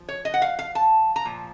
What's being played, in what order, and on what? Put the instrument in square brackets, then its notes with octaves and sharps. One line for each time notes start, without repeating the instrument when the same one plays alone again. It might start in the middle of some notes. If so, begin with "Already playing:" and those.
Already playing: [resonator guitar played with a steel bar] F3
C#5
D#5
F#5
F5
F5
A5
A#5
A#2 F3